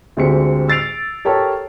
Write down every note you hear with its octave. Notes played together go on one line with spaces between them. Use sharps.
D2 D3 G#3 C4 G4 C#7
E6 A6 C7 D7 F7
G4 A4 A#4 C#5 G5 A5